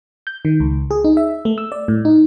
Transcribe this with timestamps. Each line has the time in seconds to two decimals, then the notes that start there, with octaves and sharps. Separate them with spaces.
0.27 G6
0.45 D#3
0.60 C#2
0.91 G#4
1.04 D#4
1.17 E5
1.45 A3
1.58 E6
1.72 D5
1.88 A2
2.05 D#4